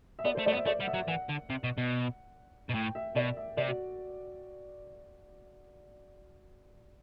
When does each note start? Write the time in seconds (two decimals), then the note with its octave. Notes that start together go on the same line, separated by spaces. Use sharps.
0.19 E5
0.25 B3 D5
0.35 A3 C5
0.46 A3 D5
0.53 B3
0.57 E5
0.66 A3 D5
0.80 G3 F#5
0.88 E5
0.94 F#3
1.08 E3 F#5
1.29 D3
1.50 C3
1.64 B2
1.78 B2
2.69 B2
2.74 A2 G5
2.95 E5
3.16 B2 D5
3.37 E5
3.57 C3 D5
3.68 F#4